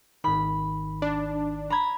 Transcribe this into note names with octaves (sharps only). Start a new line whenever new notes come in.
G#1 D#3 B5
D4
A#5 B5 G#6